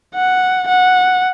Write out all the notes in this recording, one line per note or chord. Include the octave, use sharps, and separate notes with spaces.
F#5
F#5